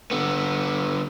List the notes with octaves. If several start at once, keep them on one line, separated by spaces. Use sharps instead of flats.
D3 B3